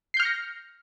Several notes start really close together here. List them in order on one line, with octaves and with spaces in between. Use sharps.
C7 G6 F6 C#7 A#6